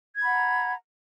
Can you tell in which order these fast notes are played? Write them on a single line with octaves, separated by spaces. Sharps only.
G#6 B5 F#5 A#5